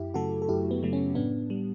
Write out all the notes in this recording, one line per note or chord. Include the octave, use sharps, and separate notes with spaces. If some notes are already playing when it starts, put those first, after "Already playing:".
Already playing: F#2 E4 G4
C#3 F#3 A3 F#4 A4
A4
F#2 E4 G4
B3
C#3 F#3 A3
C#4
A2 B3 D4
G3